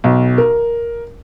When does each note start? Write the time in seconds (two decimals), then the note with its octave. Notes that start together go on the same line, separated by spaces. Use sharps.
0.04 B1
0.38 A#4